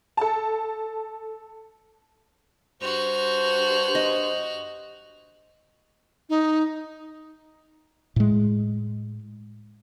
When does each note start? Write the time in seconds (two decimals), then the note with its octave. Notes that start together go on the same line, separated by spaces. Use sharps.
0.17 A4 A5
2.82 G2 F#4 C5 F7
3.95 D#5
6.29 D#4
8.16 A2 G#3